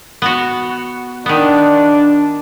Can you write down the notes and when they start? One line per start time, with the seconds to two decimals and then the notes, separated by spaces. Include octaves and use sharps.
0.22 B3 F#4
1.26 D#3 B3 D4